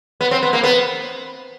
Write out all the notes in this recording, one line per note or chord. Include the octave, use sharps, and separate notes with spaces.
B3
C4
B3
A#3
B3